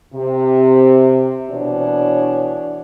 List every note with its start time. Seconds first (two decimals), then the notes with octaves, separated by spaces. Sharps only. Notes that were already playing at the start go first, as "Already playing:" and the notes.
0.15 C3
1.50 B2 E3 D4 C#5 D5